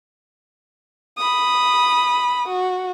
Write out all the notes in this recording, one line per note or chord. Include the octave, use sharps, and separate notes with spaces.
B5 D#6
F#4